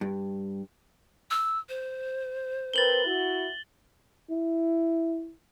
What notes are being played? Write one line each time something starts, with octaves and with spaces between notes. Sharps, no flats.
G2
E6
C5
C4 A#4 B4 A6 F#7 G7
E4 F#4
E4